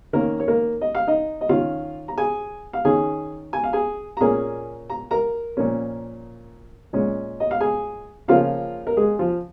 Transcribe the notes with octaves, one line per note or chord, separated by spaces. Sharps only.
D#3 A#3 C#4 A#4
C#5
A#3 A#4
D#5
F5
D#4 D#5
D#5
D#3 C#4 F4 F5
A#5
G#4 G#5
F5
D#3 C#4 G#4 G#5
G#5
F5
G#4 G#5
A#5
A#2 A#3 C#4 G#4 G#5
A#5
A#4 A#5
A#2 F3 A#3 C#4
A#2 G#3 C#4
D#5
F5
G#4 G#5
C#3 F3 A#3 C#4 F4 F5
A#4
G#3 G#4
F3 F4